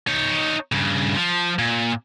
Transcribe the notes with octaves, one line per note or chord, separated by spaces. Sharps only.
D#4 C#5
G2 C#3
F3
A#2